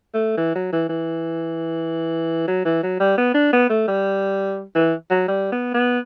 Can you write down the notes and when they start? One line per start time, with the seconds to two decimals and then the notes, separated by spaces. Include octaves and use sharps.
0.14 A3
0.37 E3
0.55 F#3
0.73 E3
0.89 E3
2.48 F#3
2.65 E3
2.83 F#3
3.00 G3
3.18 B3
3.35 D4
3.53 B3
3.70 A3
3.88 G3
4.75 E3
5.11 F#3
5.28 G3
5.52 B3
5.74 B3